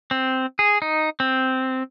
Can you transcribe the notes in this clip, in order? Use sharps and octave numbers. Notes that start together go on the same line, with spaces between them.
C4
G#4
D#4
C4